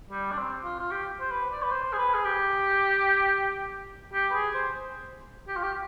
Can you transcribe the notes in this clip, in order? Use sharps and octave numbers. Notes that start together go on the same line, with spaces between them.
G3
D4
C4
F4
F4
G4
C5
B4
D5
B4
C5
G#4
B4
G#4
G4
G4
B4
G#4
C5
G4
F4
G4